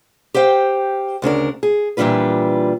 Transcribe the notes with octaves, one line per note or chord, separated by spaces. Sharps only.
G4 C5 F5 G5
D2 C#3 D4 A#4
G#4
A#2 E3 G3 D4 F4 B4